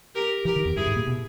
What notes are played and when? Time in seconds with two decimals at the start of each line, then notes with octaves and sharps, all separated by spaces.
0.15 G4 A#4
0.45 E3 G4 A#4
0.56 D#3
0.65 E2
0.76 G2 E4 G#4
0.87 G#2
0.96 A#2
1.07 B2